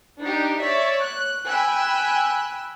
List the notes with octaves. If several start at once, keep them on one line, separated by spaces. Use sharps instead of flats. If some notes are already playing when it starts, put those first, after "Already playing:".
D4 D#4 G4
C#5 D5 E5
F#6
G5 G#5 B5 E6 F#6